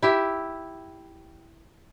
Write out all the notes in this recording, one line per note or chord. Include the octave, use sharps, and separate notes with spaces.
E4 G4 E5